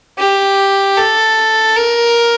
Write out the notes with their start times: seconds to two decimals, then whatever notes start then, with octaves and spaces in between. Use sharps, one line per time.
0.19 G4
0.97 A4
1.76 A#4